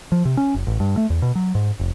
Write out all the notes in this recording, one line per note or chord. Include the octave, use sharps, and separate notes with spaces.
F3
C3
C#4
F#1
A1
G2
A3
E2
B2
F#3
G#2
F1